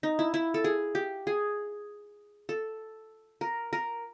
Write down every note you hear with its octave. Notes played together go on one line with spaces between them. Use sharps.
D#4
E4
E4
A4
G#4
G4
G#4
A4
A#4
A#4